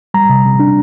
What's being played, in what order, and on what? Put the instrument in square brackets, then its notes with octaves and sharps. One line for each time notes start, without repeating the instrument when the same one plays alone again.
[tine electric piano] G3 A#5
C3
C3
D4